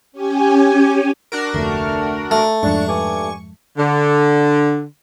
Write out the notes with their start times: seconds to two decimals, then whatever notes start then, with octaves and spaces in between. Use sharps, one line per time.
0.12 C#4 G4 G#5
1.32 D4 F#4 A#4
1.54 F1 D2 A3
2.31 A3
2.63 F2 G#2 D4 C#6
2.88 G2 G#5 D6
3.78 D3